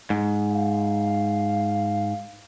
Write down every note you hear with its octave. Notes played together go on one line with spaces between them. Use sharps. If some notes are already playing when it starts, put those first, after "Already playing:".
G#2
F5